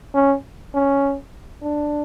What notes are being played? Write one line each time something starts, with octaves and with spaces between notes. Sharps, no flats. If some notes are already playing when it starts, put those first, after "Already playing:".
C#4
C#4
D4